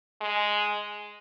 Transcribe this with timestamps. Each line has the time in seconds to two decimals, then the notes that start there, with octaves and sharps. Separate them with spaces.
0.21 G#3